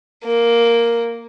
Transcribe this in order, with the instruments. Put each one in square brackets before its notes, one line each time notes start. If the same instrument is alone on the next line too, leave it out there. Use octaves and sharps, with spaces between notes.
[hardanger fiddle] A#3